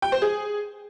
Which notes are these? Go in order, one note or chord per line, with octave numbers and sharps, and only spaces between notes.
G5
C5
G#4